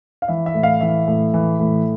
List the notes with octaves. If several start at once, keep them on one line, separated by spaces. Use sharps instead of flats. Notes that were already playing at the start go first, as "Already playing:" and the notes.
F5
E3 E5
E5
A2
F5
E3 E5
A2
E3
A2